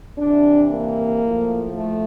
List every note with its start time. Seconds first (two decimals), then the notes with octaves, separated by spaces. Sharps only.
0.19 C3 E3 D4
0.70 A#3
1.22 A2 F3
1.76 A3